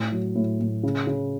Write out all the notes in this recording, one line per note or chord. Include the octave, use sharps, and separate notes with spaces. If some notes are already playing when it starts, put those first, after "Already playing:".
Already playing: A2
F#3
A2
A2
C#3
C#3